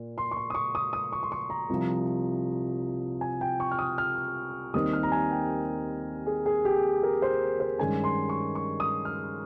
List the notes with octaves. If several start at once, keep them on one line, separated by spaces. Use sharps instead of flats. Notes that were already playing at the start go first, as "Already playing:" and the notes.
Already playing: A#2
C6
C#6
C6
D#6
C#6
D#6
D#6
C#6
C6
C#6
A#5
C2 C3 F3
G#5
G5
C#6
F6
D#6
F6
D#2 D#3 G3 C4 D#4 D#6
F6
A#5
G#5
G5
G#4
G#4
G4
A#4
C5
C5
G2 D#3 G#3 C#4 G#5
C6
C#6
C#6
D#6
F6